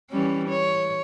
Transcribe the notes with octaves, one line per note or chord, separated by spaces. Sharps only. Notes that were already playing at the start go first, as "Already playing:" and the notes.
E3 G3 C#4
C#5